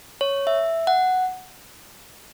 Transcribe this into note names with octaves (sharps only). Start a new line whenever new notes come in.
C#5
E5
F#5